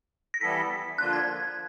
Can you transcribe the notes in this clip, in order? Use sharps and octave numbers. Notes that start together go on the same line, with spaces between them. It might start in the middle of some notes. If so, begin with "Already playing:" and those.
A#6
E3 G3 B3 E4 A4 B6
D3 F3 A#3 D4 F4 F#6
G#6